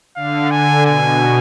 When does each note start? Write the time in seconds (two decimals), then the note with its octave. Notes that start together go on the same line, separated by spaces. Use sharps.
0.16 D3 F5
0.51 D3 G#5
0.86 B2 G#5